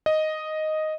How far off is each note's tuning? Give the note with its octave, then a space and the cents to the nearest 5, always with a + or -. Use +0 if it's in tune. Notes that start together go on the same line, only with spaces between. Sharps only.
D#5 +0